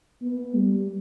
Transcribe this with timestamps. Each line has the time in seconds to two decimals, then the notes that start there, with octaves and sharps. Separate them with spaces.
0.22 B3
0.55 G3